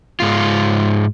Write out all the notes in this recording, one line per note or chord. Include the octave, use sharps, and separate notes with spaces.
G#2 F4